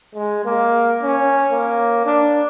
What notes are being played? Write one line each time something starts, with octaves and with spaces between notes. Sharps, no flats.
G#3
A#3
C#4
A#3
D4